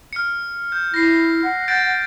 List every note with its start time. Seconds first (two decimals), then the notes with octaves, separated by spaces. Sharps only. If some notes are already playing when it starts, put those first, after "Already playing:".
0.13 F6 C#7
0.72 G6
0.94 E4 A#6 C7
1.43 F#5
1.68 G6 A6 D7